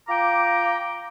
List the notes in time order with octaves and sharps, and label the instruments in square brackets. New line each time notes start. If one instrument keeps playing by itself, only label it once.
[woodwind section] F4 G5 A#5 D6